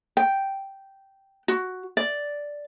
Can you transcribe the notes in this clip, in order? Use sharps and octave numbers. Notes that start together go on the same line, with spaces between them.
G5
F#4
D5